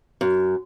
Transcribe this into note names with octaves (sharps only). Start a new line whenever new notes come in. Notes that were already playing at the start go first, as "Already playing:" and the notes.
F#2